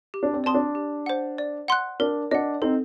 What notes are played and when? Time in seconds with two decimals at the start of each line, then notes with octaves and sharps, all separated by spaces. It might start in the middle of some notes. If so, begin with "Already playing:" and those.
0.14 G4
0.23 D4
0.33 C4
0.44 C4 D5 A5 C6 D#6
0.54 D4
0.75 G4
1.06 C5 F#5
1.38 D5
1.68 F#5 C6 F#6
2.00 D4 A#4
2.31 D4 D#5 F#5
2.62 C4 D#4 A4